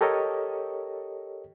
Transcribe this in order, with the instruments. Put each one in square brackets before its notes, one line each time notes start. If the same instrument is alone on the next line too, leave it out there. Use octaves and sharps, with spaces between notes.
[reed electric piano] G4 A4 A#4 C#5 D#5